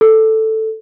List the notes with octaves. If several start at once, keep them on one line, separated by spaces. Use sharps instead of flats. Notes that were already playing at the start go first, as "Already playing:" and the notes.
A4